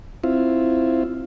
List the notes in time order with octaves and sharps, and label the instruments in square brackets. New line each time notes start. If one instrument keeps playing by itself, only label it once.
[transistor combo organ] C4 E4 F4